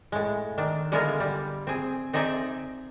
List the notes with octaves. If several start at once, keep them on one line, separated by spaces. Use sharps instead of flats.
A2 G#3
D#3 D4
D3 G#3 B3 E4 F4 A#4
G3
C4 G#4
C4 D#4 G#4 D5 E5